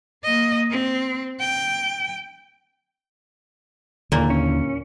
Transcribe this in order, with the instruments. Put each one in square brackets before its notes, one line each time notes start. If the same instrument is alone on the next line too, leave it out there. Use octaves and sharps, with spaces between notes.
[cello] A#3 D#5
C4
G5
[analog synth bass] D#2 [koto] A#2 A#3 [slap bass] D3 E3
[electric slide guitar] C#4